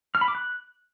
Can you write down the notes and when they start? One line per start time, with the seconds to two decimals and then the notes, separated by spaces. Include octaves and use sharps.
0.15 F6
0.21 B5
0.28 D6
0.35 F#6